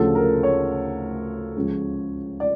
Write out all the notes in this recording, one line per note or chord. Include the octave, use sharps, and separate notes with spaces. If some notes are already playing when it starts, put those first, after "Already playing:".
Already playing: D2 C#3 F3 A4
A#4
C#5
C#2 C#3 F3
D5